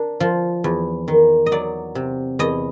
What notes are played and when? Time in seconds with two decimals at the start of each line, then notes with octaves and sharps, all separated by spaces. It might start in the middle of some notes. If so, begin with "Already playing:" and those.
Already playing: D4 A#4
0.20 F3
0.64 E2
1.08 D#3
1.46 D#5
1.52 F#3 D5
1.95 C3
2.39 E2 D#5